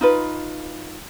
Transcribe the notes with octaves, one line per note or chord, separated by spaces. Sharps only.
D#4 F4 B4